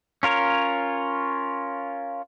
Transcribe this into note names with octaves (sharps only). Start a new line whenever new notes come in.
C#4 F4 A#4 C#5